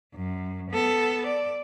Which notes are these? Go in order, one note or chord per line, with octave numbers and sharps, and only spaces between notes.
F#2
B3 A4
D5